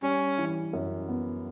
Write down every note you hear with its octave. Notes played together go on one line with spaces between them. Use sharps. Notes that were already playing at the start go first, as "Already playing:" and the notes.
G3 C#4
E3
F#2
B3